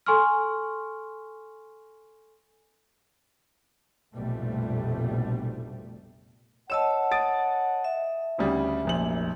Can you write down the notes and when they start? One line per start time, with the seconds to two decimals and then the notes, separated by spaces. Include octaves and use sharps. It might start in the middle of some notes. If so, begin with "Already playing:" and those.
0.06 A4 G#5 C6 C#6 F6
4.14 F1 A#1 F2 B2 G3 A3
6.70 C#5 D#5 F#5 A5 E6 E7
7.11 D#6 A6 D7
7.84 E5
8.38 D2 C#3 G3 C4 D4 D#4
8.85 F1 A#1 A#2 F#3 F#7